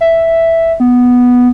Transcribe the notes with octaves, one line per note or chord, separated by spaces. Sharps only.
E5
B3